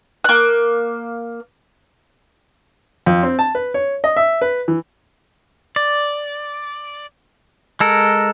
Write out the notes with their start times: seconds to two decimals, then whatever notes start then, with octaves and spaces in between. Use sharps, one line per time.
0.24 A#3 F#6
3.06 F2
3.23 C4
3.39 A5
3.55 B4
3.74 C#5
4.04 D#5
4.16 E5
4.41 B4
4.68 E3
5.76 D5
7.80 G#3 A4 A#4